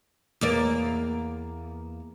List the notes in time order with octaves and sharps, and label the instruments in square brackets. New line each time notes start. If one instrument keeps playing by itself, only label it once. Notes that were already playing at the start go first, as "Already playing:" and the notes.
[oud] E2 A#3 D5